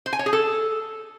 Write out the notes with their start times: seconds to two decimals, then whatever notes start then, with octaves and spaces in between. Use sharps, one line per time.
0.06 C5
0.13 G#5
0.19 C#5
0.26 G#4
0.33 A4